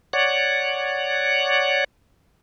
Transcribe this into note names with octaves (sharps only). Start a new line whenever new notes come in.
C#5 D5 F#5